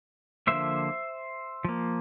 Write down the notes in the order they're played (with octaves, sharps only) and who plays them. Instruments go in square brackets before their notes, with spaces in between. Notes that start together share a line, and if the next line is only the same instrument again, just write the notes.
[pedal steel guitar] D3 F3 A#3 C5 E5
F3 A#3